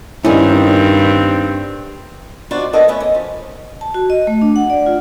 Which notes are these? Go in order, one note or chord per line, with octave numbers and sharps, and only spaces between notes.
G2 D#3 C4 C#4 E4
D#3 F3 D4 F4 F#4 D5
A#3 B3 D4 A4 D#5
A3 B3 C#4
D#5
F3
A5
F#4
D#5
A3
D4
F#5
D5
F4